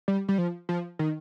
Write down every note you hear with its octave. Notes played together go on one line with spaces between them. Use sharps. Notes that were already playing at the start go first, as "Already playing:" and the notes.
G3
G3
F3
F3
D#3